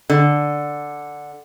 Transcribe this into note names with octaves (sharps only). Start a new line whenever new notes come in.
D3